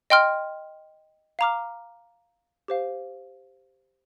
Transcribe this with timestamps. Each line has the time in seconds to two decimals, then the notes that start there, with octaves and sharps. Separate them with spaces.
0.10 D#5 G5 C6 F6
1.39 F5 A#5 D6 F6
2.68 G4 C5 F5